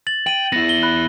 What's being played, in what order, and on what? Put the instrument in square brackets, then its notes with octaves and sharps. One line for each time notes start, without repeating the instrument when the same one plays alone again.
[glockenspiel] A6 F#7
[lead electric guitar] G5 [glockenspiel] D#7 F#7
[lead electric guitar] B3 E4 [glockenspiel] A#6
[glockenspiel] G7
B5 F#6 A#6